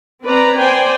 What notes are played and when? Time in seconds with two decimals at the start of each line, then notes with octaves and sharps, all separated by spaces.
0.24 C4 B4 D5 A#5
0.58 C5 D5 G5 G#5